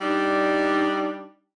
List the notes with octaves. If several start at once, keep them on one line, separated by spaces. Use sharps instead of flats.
G3 D4 D#4